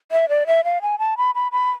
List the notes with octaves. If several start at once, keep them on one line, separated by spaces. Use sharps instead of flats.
E5
D5
E5
F5
G#5
A5
B5
B5
B5